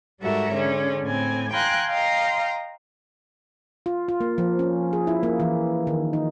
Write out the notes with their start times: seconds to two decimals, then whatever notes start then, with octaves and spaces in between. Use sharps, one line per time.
0.20 G#2 G3 F#4 A4 A#4 E5
0.52 D3 C#4 G#4
1.05 A2 C4 G#5
1.51 F5 G5 G#5 A#5 C6 F#6
1.89 D#5 F5 G5 A#5 C6
3.86 F4
4.09 F4
4.21 A#3
4.38 F3
4.59 C#4
4.93 G#4
5.07 E4
5.23 A#3
5.40 E3
5.87 D#3
6.13 D#4